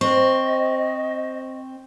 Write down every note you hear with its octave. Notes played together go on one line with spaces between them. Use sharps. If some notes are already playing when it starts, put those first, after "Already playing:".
C4 C5 D#5 C#6